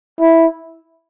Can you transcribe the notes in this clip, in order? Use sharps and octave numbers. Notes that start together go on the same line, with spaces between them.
E4